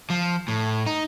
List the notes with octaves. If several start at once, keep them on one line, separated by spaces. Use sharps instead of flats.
F3
A2
D#4